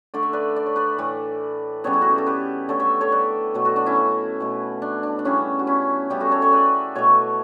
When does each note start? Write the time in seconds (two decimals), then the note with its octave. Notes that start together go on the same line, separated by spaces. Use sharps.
0.14 D3 A3 D5
0.23 E5
0.33 B4 D5
0.56 D5
0.66 C#5
0.76 B4 D5
0.98 A2 E3 A3
1.84 C#3 G3 B3 A4 C#5
1.93 E4
2.02 F#4
2.10 G4
2.18 A4
2.26 G4 B4
2.69 D3 A3 A4 C#5
2.80 C#5 E5
3.01 A4 C#5
3.12 B4 D5
3.54 B2 F#3 A3
3.65 F#4 A4
3.76 D4 F#4
3.86 C#4 E4
4.40 B2 A3
4.82 D4
5.03 D4
5.19 D4
5.25 C#3 G3 B3 C#4 E4
5.59 F#4
5.67 C#4 E4
6.10 C#3 G3 B3 E4 G4
6.20 F#4 A4
6.31 A4 C#5
6.42 C#5 E5
6.53 B4 D5
6.95 B2 A3 C#5 E5